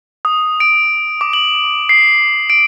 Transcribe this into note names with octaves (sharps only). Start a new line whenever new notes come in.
D#6
D7
D6
F#7
C7
D7